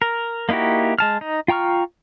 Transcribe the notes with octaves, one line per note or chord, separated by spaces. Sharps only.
A#4
A#3 D#4 E4 F#4 G4
G#3 A5 F6
D#4
F4 G5 A#5 C#6 F6